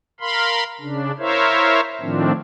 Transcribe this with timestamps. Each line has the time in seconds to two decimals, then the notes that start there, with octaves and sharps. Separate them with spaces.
0.20 A#4 F5 B5 C6
0.81 C#3 D4
1.19 E4 A#4 C5 C#5 E5 F5
2.01 A2 D#3 F3 C4 D4